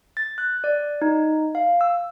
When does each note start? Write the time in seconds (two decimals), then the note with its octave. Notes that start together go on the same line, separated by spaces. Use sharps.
0.17 A6
0.38 F#6
0.64 D5
1.02 D#4
1.55 F5
1.81 E6